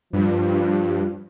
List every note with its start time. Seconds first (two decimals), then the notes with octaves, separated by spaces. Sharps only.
0.13 G2 F3